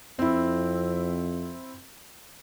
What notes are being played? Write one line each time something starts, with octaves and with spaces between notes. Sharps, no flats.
F2 C4 E4